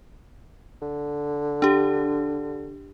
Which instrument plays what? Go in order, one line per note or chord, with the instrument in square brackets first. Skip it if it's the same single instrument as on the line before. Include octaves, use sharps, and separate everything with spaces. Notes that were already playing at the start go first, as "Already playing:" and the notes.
[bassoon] D3
[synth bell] D4 G4